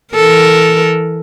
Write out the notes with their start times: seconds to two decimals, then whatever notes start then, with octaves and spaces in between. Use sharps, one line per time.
0.14 E3 A4 A#4